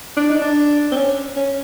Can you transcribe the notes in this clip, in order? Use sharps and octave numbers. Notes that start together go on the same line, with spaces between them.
D4
D#4
D4
C4
C#4
C#4